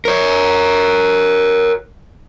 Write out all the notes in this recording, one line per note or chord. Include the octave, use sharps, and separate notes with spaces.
A#4 C#5